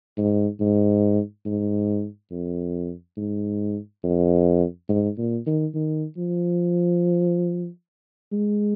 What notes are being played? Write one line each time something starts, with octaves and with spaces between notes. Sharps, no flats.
G#2
G#2
G#2
F2
G#2
F2
G#2
A#2
D#3
D#3
F3
G#3